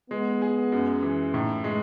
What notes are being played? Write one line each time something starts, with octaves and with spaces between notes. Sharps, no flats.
G#3 B3
G#4
F#2
E3
A2 D#4
G#3